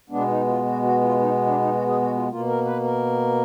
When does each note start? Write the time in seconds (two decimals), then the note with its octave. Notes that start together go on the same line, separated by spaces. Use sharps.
0.10 B2 G#3 B3 D4
0.28 D#4
0.47 F4
0.65 F#4
0.83 F#4
1.01 F4
1.20 D#4
1.46 D4
1.60 D#4
1.74 F#4
1.87 G#4
2.01 F#4
2.15 F4
2.28 B2 A#3 F4
2.47 A#4
2.65 B4
2.84 A#4